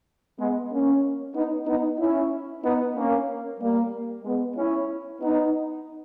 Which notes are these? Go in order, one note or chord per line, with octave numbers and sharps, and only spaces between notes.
G#3 B3
A#3 C#4
B3 D#4
B3 D#4
C#4 E4
B3 D#4
A#3 C#4
G3 A#3
G#3 B3
C#4 E4
B3 D#4